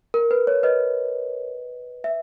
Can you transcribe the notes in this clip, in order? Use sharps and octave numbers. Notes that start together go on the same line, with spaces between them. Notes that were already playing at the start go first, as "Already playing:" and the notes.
A#4
B4
C#5
B4 D#5
E5